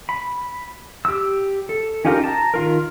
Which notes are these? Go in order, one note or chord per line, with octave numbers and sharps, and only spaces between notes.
B5
G4 E6
A4
C#4 D#4 F4 G4 A#4
A5 A#5
D#3 F4 A#4